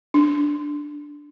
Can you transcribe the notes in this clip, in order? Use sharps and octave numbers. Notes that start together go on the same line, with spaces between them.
D4